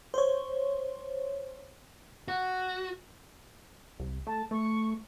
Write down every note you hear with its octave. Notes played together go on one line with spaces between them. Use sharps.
C5 C#5
F#4
C2
A3 A5
A3 C#6